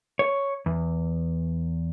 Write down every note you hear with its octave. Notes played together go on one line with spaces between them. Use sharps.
C#5
E2